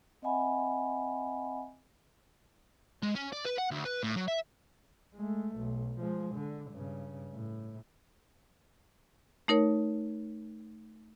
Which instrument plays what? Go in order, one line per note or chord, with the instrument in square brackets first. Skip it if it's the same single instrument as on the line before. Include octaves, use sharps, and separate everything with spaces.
[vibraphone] C4 D#5 E5 F#5 G#5 B5
[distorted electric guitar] G#3
C#4
D5
B4
F#5
D2
B4
A2
F#3
E5
[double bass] G#3 A3
B1
F3 G#3
D3
G2 C#3
A2
[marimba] A3 D#4 A#4 C#5